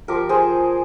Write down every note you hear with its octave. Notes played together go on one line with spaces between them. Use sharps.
F3 G4 A#4
G#4 C5